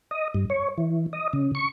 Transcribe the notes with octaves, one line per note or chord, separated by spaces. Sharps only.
D#5
G2
C#5
E3
D#5
C#3
C#6